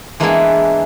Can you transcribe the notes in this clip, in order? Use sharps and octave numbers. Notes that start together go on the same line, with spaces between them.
E3 G#3 A#3 B3 D4 E4